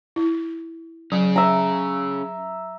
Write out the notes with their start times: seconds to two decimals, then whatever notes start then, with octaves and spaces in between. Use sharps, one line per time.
0.16 E4
1.12 F#3 C#4 G#4
1.36 E5 A#5